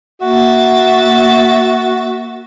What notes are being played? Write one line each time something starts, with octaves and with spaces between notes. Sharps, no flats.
A#3 F#4 E5 A6